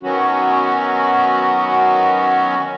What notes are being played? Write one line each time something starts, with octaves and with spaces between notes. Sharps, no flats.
D#3 F#3 B3 C#4 F#4